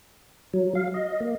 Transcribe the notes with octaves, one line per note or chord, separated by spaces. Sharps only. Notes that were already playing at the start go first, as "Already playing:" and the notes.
F#3
F5
D#5
A#3